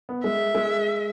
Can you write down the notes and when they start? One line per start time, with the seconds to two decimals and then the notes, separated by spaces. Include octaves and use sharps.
0.09 B3
0.24 G#3 E5
0.55 G#3